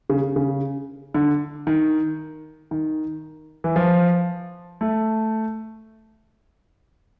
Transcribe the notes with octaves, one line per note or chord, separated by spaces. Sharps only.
C#3
C#3
D3
D#3
D#3
E3
F3
A3